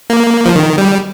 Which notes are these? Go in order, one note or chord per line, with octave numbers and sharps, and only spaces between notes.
A#3
F3
D#3
G3